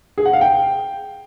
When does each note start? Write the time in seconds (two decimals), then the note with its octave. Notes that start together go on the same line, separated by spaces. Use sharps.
0.18 G#4
0.25 F#5
0.33 F5
0.41 G5